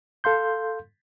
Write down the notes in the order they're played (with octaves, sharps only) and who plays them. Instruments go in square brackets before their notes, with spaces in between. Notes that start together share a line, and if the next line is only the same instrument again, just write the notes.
[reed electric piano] A4 F5 C6 G6